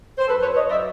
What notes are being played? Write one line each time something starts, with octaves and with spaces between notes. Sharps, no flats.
C5
F#2 A4 B4
B4 C#5
F#3 C#5 D#5
D#5
D5 E5